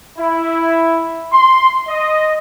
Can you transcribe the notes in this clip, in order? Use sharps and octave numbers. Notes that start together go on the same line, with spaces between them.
E4
C6
D#5